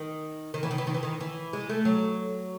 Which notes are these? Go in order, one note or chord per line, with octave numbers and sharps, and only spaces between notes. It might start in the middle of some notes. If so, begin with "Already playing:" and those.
Already playing: D#3
D#3
E3
D#3
E3
D#3
E3
D#3
E3
G#3
A3
F#3